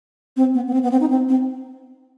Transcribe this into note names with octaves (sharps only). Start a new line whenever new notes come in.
C4
B3
B3
C4
B3
C4
D#4
C4
C4